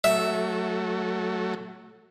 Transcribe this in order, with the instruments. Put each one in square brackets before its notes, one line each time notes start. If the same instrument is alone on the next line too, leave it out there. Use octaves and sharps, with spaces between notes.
[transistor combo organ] F#3 A3 [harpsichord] E5